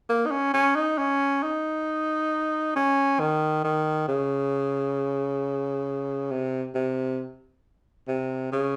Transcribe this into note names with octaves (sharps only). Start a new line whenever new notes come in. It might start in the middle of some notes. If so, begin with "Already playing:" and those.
A#3
D#4
C#4
C#4
D#4
C#4
D#4
C#4
D#3
D#3
C#3
C3
C3
C3
C#3